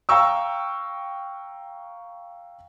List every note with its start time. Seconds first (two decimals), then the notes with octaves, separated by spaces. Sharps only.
0.09 F5 G5 A#5 C#6 E6